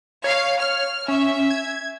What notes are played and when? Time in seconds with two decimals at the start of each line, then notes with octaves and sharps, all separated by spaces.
0.24 C#5 F5
0.60 F6
1.08 C#4 E5
1.50 G#6